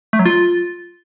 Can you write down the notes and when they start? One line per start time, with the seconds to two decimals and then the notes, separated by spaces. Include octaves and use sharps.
0.13 A3
0.19 F#3
0.26 F4